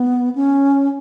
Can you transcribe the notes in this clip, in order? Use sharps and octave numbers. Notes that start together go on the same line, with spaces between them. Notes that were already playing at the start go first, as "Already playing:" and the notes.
Already playing: B3
C#4